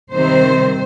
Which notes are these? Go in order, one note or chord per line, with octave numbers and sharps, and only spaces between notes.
C3 D#3 G3 C4 C5